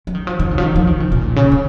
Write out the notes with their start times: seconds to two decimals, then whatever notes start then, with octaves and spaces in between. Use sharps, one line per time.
0.07 F3
0.15 D#3
0.27 F3
0.40 D#3
0.51 C#3
0.58 F3
0.63 D#3
0.76 F3
0.87 D#3
1.00 C#3
1.12 A#2
1.36 C#3
1.52 C#3